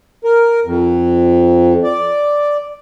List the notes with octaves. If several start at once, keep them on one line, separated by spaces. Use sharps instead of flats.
A#4
F2
D5